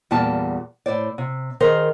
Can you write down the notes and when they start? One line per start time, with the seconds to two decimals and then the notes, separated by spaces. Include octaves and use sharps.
0.11 E2 A#2 G3 G5 A5
0.86 A2 C5 D5
1.18 C3
1.60 D#3 G#4 A#4 C5